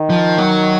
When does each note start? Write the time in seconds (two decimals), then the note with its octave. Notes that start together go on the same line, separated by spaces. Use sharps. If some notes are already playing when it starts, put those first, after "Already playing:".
Already playing: D#3
0.10 F3
0.38 F#3